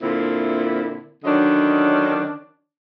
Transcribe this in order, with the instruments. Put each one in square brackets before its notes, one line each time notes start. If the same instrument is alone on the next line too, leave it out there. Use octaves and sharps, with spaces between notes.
[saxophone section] A#2 D3 C4 E4
D3 D#3 F#3 C#4 D4 D#5